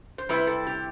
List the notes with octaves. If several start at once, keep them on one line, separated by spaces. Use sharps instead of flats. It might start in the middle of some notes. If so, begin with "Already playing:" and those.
C5
C3 G3 C4 E4 B4
A4
G4